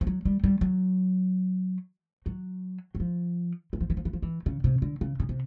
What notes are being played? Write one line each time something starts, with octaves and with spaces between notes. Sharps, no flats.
F3
F#3
G3
G3
F#3
F#3
F#3
F3
E3
F3
E3
F3
E3
F3
E3
C#3
C3
D3
C#3
C#3
C3